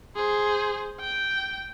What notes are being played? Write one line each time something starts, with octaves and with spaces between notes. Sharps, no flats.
G#4 C5
G5